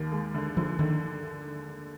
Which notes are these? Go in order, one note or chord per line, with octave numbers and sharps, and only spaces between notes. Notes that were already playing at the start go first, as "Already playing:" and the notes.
Already playing: D#2 D#3 A#3
G#3
D3
D3 F3
D3 D#3